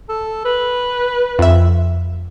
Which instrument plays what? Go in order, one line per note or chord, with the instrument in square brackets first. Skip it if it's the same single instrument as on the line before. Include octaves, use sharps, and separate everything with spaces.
[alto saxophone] A4
B4
[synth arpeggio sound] F2 E5